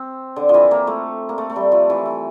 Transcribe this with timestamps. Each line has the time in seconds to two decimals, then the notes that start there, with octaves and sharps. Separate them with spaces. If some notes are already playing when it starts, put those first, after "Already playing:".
Already playing: C4
0.36 D3
0.49 F3
0.54 E3
0.71 A#3
0.87 A3
1.29 A#3
1.38 A3
1.50 A3
1.56 G3
1.72 F3
1.90 E3
2.06 E3